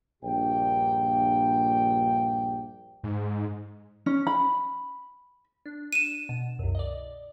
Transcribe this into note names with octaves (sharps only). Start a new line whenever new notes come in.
A#1 G2 A#2 G4 G5
G#2
C#4
B5
D4
D#7 E7
B2
C2 F#2
D5 D#5